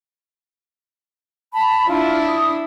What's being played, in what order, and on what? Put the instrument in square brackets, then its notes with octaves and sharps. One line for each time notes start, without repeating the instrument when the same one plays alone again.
[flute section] A5 B5
[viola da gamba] D4 E4 [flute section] F4
[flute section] D#6